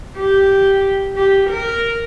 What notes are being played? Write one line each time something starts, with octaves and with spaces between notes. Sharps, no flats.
G4
G4
A#4